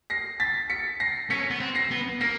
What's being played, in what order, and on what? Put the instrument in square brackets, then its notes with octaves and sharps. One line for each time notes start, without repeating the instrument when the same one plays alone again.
[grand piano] A#6 C7
A6 B6
B6 C#7
A#6 C7
[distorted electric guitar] C#4 [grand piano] B6 C#7
[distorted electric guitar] B3
C4
[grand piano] A#6 C7
[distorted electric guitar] B3
[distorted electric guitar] A#3 [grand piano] A#6 C7